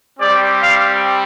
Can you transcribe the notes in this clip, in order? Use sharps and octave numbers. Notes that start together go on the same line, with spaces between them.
G3 C4 G4 D5
F5